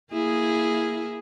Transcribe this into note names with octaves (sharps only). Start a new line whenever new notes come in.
A#3 E4 G#4